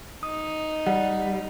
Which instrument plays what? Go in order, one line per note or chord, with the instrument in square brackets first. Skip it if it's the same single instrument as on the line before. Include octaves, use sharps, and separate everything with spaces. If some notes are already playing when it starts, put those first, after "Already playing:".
[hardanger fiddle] D#4 [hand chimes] D#6
[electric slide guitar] G3 [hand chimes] F#5